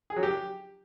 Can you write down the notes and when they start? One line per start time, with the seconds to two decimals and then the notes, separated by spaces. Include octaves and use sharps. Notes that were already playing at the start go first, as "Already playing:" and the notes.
0.10 G#4
0.16 F#3
0.23 G4